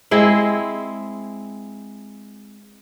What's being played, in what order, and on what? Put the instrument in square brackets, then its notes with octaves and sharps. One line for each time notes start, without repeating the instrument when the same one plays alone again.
[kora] G#3 C4 E4